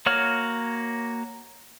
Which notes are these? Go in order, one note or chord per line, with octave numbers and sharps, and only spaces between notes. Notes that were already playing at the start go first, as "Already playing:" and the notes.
A#3 F#4 C#5 F6